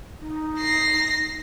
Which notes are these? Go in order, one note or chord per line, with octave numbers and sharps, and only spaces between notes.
D#4
A#6 C7